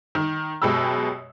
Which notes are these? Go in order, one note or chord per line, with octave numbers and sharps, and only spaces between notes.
D#3
F#2 B2 G#3 G4 B5 E6